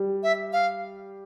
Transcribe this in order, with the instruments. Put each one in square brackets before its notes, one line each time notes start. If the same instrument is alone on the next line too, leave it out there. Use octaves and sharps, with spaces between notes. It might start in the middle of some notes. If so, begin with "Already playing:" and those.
Already playing: [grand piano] G3
[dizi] E5
F5